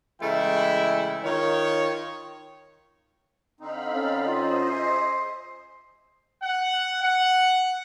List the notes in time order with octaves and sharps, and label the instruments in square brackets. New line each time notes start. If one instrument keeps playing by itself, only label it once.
[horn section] C#3 E3 G#3 A3 E4 G5
D#3 F4 C#5
[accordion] D3 C4 D#4 [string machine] F5 B5
[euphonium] C#4 [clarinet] A4
[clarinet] F4 [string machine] C5 D#5
[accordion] G#4 E5 [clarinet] C6
[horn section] F#5
F#5